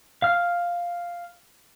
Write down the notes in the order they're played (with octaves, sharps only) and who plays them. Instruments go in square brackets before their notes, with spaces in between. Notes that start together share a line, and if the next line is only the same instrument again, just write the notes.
[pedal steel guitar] F5 F6